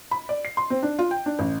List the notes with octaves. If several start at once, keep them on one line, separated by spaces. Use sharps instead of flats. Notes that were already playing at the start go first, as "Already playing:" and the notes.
B5
D5
C7
C6
C4
D4
F4
G5
D4
A1